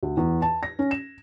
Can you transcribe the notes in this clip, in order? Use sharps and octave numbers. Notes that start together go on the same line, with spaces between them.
D2
E2
A5
A#6
C#4
E7